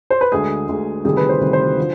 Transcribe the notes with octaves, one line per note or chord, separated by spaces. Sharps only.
C5
B4
D2 D3 G#3 G#4
D2 D3 G#3
D2 C3 D#3 G3 G#4
B4
C5
D2 C3 D#3 G3
C5
D3 F3